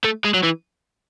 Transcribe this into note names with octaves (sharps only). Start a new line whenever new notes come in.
A3
G#3
F#3
E3